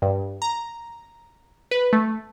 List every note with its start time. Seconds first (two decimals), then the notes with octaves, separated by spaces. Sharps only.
0.02 G2
0.42 A#5
1.71 B4
1.93 A3